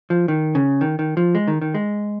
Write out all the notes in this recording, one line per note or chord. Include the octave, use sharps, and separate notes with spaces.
F3
D#3
C#3
D#3
D#3
F3
G#3
D#3
D#3
G#3